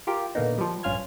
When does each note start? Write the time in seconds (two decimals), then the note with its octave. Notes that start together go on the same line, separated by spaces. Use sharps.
0.07 F4 G4 A#4
0.35 A#2 D3 A#3 B3 D#4
0.58 F3 G3
0.83 A#1 G2 C#4 F4 F6 G#6